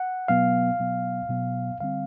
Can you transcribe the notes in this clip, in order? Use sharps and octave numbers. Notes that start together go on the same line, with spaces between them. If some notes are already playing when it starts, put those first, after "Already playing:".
Already playing: F#5
B2 F#3 B3 F5
B2 F#3 B3
B2 F#3 B3
D3 G3 C4 F5